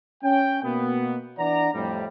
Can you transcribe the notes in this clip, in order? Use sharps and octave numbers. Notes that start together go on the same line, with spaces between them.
C#4 G5
B2 A#3 B3
E3 D4 D5 F#5 A#5
F2 A2 G3